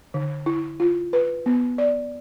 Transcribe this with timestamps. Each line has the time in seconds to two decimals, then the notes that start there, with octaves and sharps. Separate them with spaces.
0.14 D3
0.46 E4
0.80 F4
1.13 B4
1.46 B3
1.78 D5